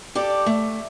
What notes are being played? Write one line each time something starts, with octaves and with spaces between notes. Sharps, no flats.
G4 A4 D5
A3